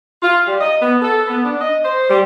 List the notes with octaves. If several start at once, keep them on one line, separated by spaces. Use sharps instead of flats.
F4
G3
D#5
B3
A4
B3
D4
D#5
C5
G3